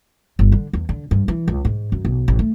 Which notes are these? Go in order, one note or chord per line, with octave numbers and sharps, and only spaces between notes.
G1
D3
E2
D3
G2
E3
C#2
G#2
F#2
B1
A1
A3